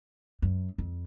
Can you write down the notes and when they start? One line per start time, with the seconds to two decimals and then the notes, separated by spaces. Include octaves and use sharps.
0.42 F#2
0.78 F2